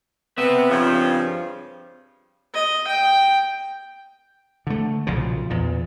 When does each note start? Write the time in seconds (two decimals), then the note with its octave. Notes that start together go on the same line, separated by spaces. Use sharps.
0.38 B3 C4 E5
0.70 G2 C#3 F3
2.54 D#5
2.87 G5
4.67 D3 A3
5.07 B1 A#2 C#3 F3
5.50 E2 A#2